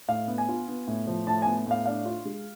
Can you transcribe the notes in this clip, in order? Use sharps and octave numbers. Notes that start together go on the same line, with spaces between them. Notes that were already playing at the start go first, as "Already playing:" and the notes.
A2 F5
B3
G#5
F4
B3
A2
F3
A2 A5
B3 G#5
A2 F5
D4 F5
F4
G#3